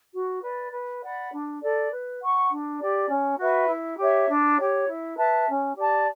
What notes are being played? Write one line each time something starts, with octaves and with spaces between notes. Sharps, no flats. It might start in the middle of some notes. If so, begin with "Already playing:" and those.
F#4
B4 D5
B4
D5 F#5 B5
D4
A4 D5
B4
F#5 C#6
D4
G4 D5
C#4
F#4 B4 E5
E4
G4 C#5 E5
D4
G4 C#5
E4
B4 E5 A5
C#4
G4 D5 A5